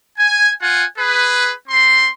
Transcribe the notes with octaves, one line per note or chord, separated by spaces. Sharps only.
G#5
F4 F#5 G#5
G#4 B4
C4 C6